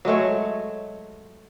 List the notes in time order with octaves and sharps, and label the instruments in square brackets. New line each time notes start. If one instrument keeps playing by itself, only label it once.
[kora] F#3 G#3 A3 C#5